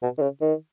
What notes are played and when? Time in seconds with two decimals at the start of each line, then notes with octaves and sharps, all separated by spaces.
0.02 B2
0.18 D#3
0.22 C#3
0.41 D#3